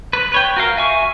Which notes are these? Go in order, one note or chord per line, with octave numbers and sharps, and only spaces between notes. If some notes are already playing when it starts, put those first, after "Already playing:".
B4
B4 C#5 G5
F#4 A#4 F5
E5 G#5 C#6